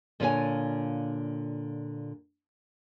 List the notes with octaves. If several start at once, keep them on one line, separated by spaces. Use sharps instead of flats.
A#2 D3 F4 F#4 C#5 G#5